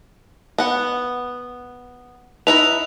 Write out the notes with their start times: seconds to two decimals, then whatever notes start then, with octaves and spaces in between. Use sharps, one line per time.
0.58 B3 F#5
2.47 D#4 E4 B4 F7